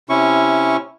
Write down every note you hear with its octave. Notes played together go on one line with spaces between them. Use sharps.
C3 C#4 E4 C#6